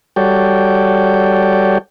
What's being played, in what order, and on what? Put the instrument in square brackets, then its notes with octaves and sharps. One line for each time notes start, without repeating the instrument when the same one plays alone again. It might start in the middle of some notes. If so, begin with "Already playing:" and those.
[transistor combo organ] G3 F#4 A4 C#5 D5 G5